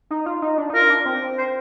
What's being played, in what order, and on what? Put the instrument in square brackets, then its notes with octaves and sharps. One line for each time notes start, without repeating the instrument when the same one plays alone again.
[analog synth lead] D#4
F4
D#4
D4
D#4
[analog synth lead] F4 [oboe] A#4
[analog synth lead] D4
C4
[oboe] C5